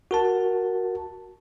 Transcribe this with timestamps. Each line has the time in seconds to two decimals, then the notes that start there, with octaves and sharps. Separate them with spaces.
0.11 F#4 A#4 A5